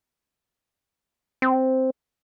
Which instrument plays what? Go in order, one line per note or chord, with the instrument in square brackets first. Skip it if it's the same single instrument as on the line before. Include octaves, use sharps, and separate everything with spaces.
[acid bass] C4